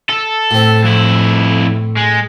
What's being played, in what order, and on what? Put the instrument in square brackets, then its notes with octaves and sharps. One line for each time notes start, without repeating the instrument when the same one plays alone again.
[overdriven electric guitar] A4
[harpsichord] A2 C4
[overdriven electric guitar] F2 E4
G#3